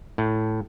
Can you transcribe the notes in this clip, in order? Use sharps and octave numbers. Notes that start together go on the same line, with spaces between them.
A2